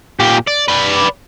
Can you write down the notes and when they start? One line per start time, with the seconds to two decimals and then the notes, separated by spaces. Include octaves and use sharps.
0.20 A#2 G4
0.47 D5
0.68 B4 D5